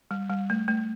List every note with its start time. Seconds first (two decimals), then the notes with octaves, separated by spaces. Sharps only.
0.11 G3
0.30 G3
0.50 A3
0.68 A3